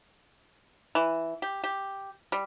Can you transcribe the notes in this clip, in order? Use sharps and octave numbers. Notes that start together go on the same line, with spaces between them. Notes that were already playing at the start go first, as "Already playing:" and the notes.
E3
G4
G4
G3